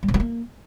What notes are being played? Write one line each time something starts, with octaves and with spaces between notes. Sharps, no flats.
G3
C3
F#3
A#3